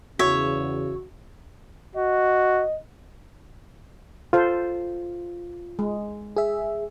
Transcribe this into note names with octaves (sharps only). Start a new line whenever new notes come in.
E2 C#3 F#4 C#5 E5
F#4 D#5
F4 A4 C5
G#3
G#4 E5